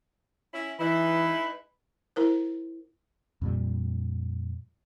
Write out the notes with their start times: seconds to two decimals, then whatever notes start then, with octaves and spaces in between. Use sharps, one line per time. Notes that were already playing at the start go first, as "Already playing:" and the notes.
0.54 C#4 E4
0.80 E3 G#3 D#4 E4 B4
2.16 E4 A#4 C5
3.42 F2 A#2 G3